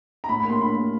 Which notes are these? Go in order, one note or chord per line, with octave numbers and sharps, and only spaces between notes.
A#5
A2 B5
B5
A#3 C6
A2 B5
A#3